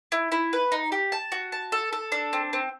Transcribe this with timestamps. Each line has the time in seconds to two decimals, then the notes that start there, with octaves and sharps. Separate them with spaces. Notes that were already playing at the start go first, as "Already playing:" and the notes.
0.12 E4
0.32 E4
0.53 B4
0.72 D#4
0.92 G4
1.12 A5
1.32 F#4
1.52 A5
1.72 A4
1.93 A4
2.12 D4
2.33 C4
2.53 C4